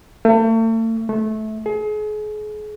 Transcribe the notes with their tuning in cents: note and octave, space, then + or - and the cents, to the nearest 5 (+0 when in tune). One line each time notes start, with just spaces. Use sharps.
A3 +40
A3 -20
G#4 +35